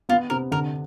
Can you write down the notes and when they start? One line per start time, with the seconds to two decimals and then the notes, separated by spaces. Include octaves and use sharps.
0.09 B3 F4
0.30 C3 A#4
0.51 D3 A#4